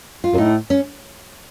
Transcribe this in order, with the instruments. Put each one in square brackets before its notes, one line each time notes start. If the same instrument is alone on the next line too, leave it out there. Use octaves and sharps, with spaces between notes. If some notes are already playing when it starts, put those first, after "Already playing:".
[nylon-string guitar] F4
[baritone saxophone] F#2
[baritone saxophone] A2 [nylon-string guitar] D#4
[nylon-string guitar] C#4